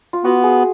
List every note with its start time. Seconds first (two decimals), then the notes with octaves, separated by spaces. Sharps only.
0.13 F4
0.24 B3 F#4
0.44 G#4